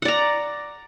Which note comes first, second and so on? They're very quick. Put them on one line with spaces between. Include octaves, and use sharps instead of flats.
F#5 D5 A#5